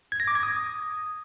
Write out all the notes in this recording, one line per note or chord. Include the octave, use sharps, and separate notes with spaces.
G#6
A#6
D6
G#6
D#6